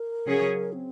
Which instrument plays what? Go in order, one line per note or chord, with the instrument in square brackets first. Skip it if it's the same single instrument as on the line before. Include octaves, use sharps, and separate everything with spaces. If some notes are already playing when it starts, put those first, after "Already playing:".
Already playing: [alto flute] A#4
[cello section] C#3 F#3 C#4 G#4 C#5
[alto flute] C4